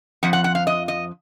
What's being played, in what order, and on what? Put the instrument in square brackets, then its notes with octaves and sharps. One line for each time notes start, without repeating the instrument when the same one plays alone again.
[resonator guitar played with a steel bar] F2 F3 F#5
F#5
F#5
F5
D#5
D#5